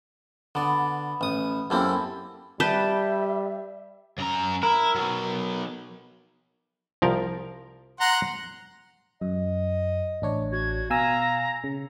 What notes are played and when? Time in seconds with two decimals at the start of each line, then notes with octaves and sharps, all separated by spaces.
0.55 D3 B3 D5
1.21 A1 D#6
1.70 F#2 A#3 C4 E4 G4 A4
2.60 G3 B4 E5 G5 A5
4.18 F#2 A#5
4.63 E4 A#4
4.95 F#3 B3
7.02 C2 F3 A#4
8.00 F#5 A#5 C6
9.21 F#2 D#5
10.22 A1 D4 C#5
10.52 F#4 G#6
10.90 B2 F5 G#5 A#5 E6
11.64 C#3